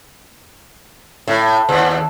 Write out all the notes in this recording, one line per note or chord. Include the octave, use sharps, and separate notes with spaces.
A2
D#2